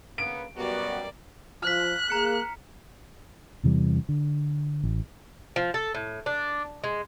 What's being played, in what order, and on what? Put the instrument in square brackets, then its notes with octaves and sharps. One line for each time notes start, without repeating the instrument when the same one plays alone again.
[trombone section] C#3 A#3 B3 [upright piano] D7
[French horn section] F#2 B2 G3 [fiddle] A#3 D5 [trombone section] B3 F#4
[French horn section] F3 F4 [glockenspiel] F6 B6 [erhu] F#6
[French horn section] A#3 G#4 [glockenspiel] A#5 C#7
[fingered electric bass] E2 C3 E3 G3
D3
A1
[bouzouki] F3
A4
A2
D4
G#3